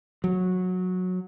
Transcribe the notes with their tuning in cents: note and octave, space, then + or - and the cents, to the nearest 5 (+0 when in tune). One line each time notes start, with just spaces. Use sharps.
F#3 -15